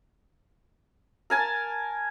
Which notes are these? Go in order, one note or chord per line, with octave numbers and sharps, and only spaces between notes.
A#4 G#5 A5